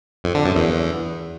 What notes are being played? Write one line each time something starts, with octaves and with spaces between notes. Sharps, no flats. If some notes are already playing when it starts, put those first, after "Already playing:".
F2
D3
F#2
E2